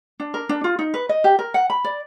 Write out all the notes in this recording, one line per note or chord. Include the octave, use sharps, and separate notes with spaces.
D4
A#4
D4
F4
D#4
B4
D#5
G4
A#4
F#5
B5
D5